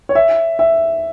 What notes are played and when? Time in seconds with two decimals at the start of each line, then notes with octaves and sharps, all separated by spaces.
0.09 C#5
0.15 E5
0.59 E5